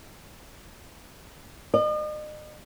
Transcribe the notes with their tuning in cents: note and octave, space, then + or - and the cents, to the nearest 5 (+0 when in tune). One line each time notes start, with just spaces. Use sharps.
D#5 -40